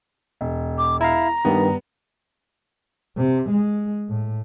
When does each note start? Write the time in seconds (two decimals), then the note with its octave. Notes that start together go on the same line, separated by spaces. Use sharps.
0.41 E1
0.78 D6
1.01 E4 F5 A#5
1.45 G2 D#3 G3 B3
3.18 C3
3.49 G#3
4.09 A2